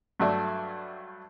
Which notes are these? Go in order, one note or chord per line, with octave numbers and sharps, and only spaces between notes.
G2 F#3 A3 D5 E5